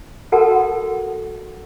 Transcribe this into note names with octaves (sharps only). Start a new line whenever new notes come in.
F#4 A4 A#4 F#5 A5